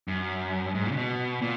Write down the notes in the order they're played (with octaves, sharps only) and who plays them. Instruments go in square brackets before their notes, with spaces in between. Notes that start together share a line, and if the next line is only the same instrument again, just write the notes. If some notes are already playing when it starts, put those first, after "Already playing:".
[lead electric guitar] F#2
G#2
A#2
C#3
B2
A#2